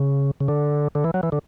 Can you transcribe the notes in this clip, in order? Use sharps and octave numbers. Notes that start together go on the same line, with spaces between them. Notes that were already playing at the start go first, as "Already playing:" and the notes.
Already playing: C#3
C#3
D3
D3
E3
F#3
E3
D3